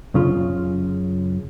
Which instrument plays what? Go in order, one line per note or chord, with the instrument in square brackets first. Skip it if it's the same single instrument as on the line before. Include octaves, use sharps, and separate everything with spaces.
[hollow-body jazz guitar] F#2 C#3 F4